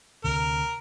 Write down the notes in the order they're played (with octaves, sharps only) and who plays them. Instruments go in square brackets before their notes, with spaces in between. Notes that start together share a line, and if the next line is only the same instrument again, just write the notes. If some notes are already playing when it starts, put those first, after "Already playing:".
[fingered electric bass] D2 C3 [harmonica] A#4